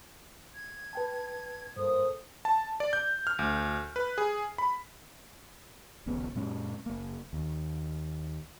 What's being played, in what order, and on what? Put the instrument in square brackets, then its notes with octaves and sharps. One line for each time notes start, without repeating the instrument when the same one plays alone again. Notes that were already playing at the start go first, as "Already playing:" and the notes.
[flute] G#6
[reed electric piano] B4 G5 A5
[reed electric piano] G2 [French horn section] A#3 A4 C5 [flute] D#6
[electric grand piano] A5
D5
G6
F6
D2
B4
G#4
B5
[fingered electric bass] D#1 A#1 C#3 B3
F#2 A#2 G#3 C#4
F#1 A#3
D#2